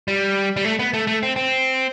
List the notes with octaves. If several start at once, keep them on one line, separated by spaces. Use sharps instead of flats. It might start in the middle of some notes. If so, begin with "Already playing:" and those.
G3
G3
A3
B3
A3
A3
C4
C4